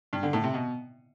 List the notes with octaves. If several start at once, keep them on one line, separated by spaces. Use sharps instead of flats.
G2
D3
A2
C3
B2